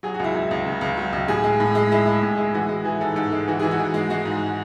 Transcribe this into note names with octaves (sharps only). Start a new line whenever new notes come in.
F#3 G#4
F#4
C#2 E4
C#2 E4
C#2
C#3
C#2
F#3
C#2
A2 G#4
G#3
A2
G#3
G#3 E4
G#3
A2
G#3
E3 F#4
G#3
E3 G#4
G#2 A4
G#2 A4
G#3
E3 F#4
E3 G#4
F#4
G#2
G#3
G#3 F#4
G#2